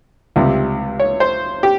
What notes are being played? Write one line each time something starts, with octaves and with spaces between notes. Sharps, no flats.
C#2 C3 G3
C#5
C5
G4